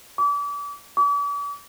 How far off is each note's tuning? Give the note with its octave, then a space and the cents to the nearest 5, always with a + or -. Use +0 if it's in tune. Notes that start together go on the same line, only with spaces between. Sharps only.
D6 -35
D6 -45